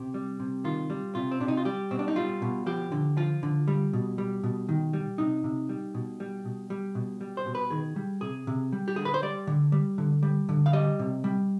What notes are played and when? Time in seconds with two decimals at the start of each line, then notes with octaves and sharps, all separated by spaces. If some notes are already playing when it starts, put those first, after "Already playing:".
Already playing: C3 G4
0.14 G3
0.40 C3
0.64 D#3 F4
0.90 G3
1.15 C3 F4
1.31 C4
1.40 C3 D4
1.48 D#4
1.57 F4
1.65 G3 G4
1.91 B2 C4
1.99 D4
2.08 D#4
2.16 G3 F4
2.42 B2
2.66 F3 G4
2.92 D3
3.17 F3 F4
3.43 D3
3.68 G3
3.93 B2
4.18 G3
4.44 B2
4.69 D#3
4.93 G3
5.18 C3 D#4
5.44 C3
5.69 G3
5.94 B2
6.20 G3
6.45 B2
6.70 G3
6.95 B2
7.21 G3
7.37 C5
7.46 B2
7.55 B4
7.70 D#3 G#4
7.96 G3
8.21 C3 G#4
8.47 C3
8.72 G3
8.88 G4
8.96 D3 G#4
9.05 B4
9.14 C5
9.23 G3 D5
9.47 D3
9.72 G3
9.98 D3
10.23 G3
10.49 D3
10.66 F5
10.73 G3 D#5
10.99 C3
11.24 G3